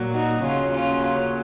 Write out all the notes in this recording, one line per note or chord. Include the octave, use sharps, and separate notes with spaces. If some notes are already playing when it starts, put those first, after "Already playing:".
Already playing: A#2 F#3
D#4 F#4
D#2 C#3 F#3 C#4 F4
C#4 F4